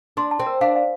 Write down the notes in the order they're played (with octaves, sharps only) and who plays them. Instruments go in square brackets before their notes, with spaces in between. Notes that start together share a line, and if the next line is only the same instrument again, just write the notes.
[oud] D4 [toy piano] C6
[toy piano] A5
[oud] C4
[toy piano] A#4
[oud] D4 [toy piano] F5
[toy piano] F5